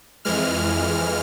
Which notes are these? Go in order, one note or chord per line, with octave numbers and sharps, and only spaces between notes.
F2 E3 G#3 F6